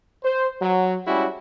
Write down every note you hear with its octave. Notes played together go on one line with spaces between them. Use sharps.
C5
F#3
G3 G#3 C#4 E4 F#4